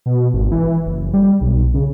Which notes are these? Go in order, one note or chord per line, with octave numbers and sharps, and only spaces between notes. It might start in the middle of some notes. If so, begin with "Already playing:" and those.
B2
G#1
E3
F#1
G3
B1
C#3